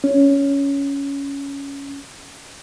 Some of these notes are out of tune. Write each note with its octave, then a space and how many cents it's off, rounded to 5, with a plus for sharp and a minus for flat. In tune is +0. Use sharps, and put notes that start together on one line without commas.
C#4 +10